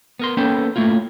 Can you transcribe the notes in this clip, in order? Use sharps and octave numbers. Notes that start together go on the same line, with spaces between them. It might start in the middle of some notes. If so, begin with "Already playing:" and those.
B3 A#4 C6
A#3 B3 C#4 A4 B4 G5
A3 A#3 E4 F4